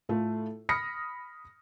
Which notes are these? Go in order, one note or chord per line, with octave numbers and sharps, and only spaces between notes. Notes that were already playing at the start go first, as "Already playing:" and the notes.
A2 A3 F4
B5 D#6 F6 A#6 C#7